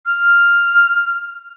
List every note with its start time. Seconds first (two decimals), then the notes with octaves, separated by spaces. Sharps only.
0.06 F6